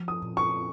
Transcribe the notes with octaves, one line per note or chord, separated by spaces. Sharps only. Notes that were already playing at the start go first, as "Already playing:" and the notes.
Already playing: F3
D#6
A#2
C#6